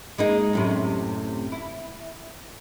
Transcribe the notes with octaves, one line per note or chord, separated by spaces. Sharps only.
G#3 A#3 D#4
F#2 A2 C3
E4